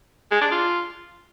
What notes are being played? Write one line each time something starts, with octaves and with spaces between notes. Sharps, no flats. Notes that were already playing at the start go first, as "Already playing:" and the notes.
G#3
D4
F4